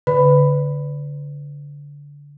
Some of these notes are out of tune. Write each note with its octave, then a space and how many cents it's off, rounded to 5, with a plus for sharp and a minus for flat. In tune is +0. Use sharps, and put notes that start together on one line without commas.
D3 -25 B4 +20 B5 +10